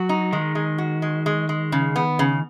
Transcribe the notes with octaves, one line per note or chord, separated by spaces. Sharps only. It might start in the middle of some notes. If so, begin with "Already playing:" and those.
Already playing: F#3 F#4
D#4
D#3 G#3
G#3
F#4
G#3
G#3
G#3
C#3
B3
C#3